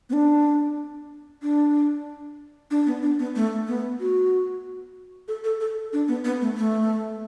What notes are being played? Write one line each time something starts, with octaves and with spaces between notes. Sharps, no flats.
B3
D4
D4
D4
B3
D4
B3
A3
B3
F#4
A4
A4
A4
D4
B3
B3
A3
A3